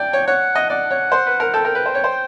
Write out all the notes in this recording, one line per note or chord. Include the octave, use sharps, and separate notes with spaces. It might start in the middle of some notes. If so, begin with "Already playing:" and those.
Already playing: D5 G5
C#5
C#5 F#5
D#5
D5 F#5
C#5
C5
B4
A#4
A4 G5
A#4
B4
C5
C#5
C5